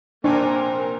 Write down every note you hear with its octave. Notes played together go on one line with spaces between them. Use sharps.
F1 A#2 A#3 C4 D4 A#4 G#5